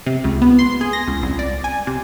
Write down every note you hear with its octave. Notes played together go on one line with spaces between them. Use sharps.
C3
C#2
B3
C6
G#4
A#6
C#2
C2
D5
G#5
C3